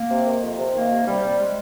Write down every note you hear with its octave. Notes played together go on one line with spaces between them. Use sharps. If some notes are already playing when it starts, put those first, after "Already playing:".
Already playing: A#3
C3
D#3
F2
C3
D#3 A#3
C3
C3 G3
C3
G#3